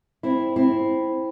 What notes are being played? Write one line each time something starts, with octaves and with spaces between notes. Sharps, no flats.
C4 E4
C4 E4